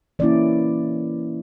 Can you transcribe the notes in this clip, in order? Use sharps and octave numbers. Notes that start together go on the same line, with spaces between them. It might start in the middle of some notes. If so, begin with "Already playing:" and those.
E3 A#3 C#4 E4 D5